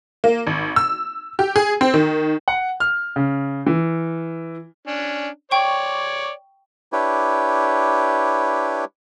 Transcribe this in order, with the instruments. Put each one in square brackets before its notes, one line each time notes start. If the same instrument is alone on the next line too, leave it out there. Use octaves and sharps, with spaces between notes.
[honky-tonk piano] A#3
G#1
E6
G4
G#4
C4
D#3
[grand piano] F#5
F6
C#3
E3
[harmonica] C#4 D4
[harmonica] C#5 D5 [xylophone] G5 C#6
[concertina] D4 E4 G4 B4 C#5